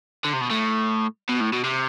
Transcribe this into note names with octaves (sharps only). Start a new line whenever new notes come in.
D3
C3
B2
A2
B2
A2
B2
C3